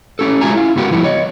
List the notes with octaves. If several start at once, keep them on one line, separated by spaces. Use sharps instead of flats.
A3 C#4 G4 A4
F#3 G#3 F4 E5 G#5 A#5
E4 F5
G#2 C#3 B3 F#4 G4 A#4
F3 G3 A3 B3 E4
C#5 D#5